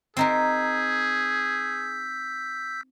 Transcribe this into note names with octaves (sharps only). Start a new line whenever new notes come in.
C4 D#4 G#4 A#4 E6 G6 B6